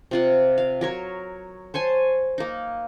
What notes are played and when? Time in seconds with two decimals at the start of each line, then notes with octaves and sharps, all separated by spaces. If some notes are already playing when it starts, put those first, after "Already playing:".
0.11 C3 F4 F#5
0.58 F5
0.81 F#3 A#4 C#5
1.74 C5 C#5 G#5 A5
2.38 A#3 D#4